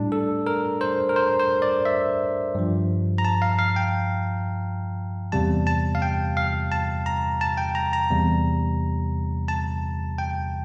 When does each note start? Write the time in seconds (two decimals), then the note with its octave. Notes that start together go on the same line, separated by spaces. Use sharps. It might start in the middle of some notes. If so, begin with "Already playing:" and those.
Already playing: A2 G3 D4
0.12 A4
0.47 A#4
0.81 C5
1.09 A#4
1.16 C5
1.40 C5
1.62 D5
1.85 E5
2.55 G2 F3
3.18 A#5
3.25 A5
3.42 F5
3.59 F5
3.76 G5
5.32 E2 C3 G3 A5
5.67 A5
5.95 F5
6.02 G5
6.37 F5
6.72 A5
7.06 A#5
7.41 A5
7.57 G5
7.75 A#5
7.93 A#5
8.10 E2 C3 G3
9.48 A5
10.18 G5